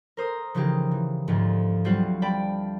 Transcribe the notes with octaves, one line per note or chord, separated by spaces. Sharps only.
A#4 C5 D#6
C#3 E3 F3 D#4 G4 G#4
E3
D2 G#2 F3 A3
F#3 G3 C4 F4 C5 F#5
D5 G5 A5 B5